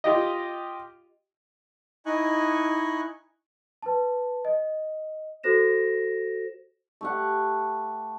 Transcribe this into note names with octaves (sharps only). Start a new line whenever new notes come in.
F4 G4 D#5
D#4 E4 D#5 G#5 C#6 F#6
B4 A5
D#5
F#4 A4 C5 A#6 E7
A3 G4 F#5